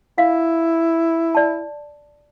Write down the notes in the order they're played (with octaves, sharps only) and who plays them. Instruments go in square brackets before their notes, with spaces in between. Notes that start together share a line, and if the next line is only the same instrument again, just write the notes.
[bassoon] E4 [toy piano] F5
[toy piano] D5 A5